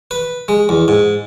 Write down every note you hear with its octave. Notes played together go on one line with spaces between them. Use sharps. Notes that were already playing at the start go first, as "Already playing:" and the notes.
B4
G#3
E2
G#2